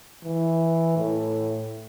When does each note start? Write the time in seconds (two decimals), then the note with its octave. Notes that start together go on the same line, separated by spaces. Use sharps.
0.24 E3
0.97 A2